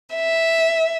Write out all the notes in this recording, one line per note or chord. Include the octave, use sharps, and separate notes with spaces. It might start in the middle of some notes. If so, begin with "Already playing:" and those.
E5